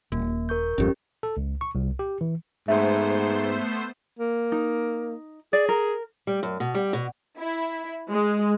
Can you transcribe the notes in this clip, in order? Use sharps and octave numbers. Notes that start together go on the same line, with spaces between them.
D#1 A#3
A#4 C#6 G6
G1 F2 G#2 C#4 G4
A4
C#2
C#6
C2
G4
E3
G#2 A3 B3 C5 E5
A#3
D#4
G#4 D5
A#4
G3
F#2
B2
G3
B2
E4
G#3